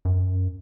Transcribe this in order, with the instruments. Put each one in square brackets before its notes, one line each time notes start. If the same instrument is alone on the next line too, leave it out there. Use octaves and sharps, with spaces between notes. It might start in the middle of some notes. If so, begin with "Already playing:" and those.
[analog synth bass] F#2